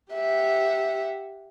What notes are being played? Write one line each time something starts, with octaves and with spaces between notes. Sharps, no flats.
G4 E5 F#5